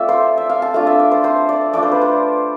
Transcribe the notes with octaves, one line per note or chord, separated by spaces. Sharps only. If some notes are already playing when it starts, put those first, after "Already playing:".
Already playing: A3 C4 F4 D5 E5
C5
E5
F5
A5
A3 D4 F4 F5
E5
D5
C5
C5
D5
A3 D4 F4 D5
C5
B4
C5